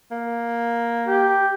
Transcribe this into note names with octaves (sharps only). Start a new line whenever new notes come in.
A#3
G4